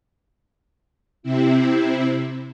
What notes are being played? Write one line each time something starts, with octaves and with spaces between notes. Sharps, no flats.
C3 C4 E4